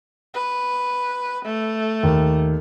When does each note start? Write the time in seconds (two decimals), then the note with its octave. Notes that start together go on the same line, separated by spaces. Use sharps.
0.34 B4
1.45 A3
2.03 D#2